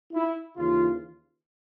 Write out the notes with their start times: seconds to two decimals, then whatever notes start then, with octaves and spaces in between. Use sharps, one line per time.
0.13 E4
0.57 D#2 C#3 E3 F4